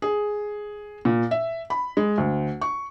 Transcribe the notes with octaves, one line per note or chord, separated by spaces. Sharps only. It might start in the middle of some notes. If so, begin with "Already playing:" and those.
G#4
A#2
E5
B5
G#3
D2
C#6